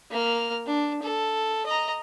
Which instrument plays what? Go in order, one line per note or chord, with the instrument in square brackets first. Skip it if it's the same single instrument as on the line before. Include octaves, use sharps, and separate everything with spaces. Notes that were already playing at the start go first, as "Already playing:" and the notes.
[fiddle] A#3 F6
D4
A4
D#5 A#5